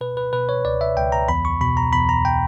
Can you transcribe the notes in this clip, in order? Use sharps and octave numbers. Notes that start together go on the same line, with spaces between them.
B2 B4
B4
B2 B4
C#5
C#2 D5
E5
C#2 G5
A#5
E2 B5
C#6
B2 B5
A#5
E2 B5
A#5
G5